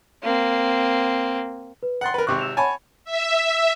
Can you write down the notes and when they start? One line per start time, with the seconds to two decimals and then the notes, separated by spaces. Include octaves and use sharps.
0.23 A#3 C4
1.83 B4
2.01 F#5 G5 C6 F#6 A6
2.14 A#4 B4
2.27 G#1 C3 C#6 D6 F#6
2.39 E6 E7 F7
2.57 C#5 F#5 G#5 A5 B5
3.05 E5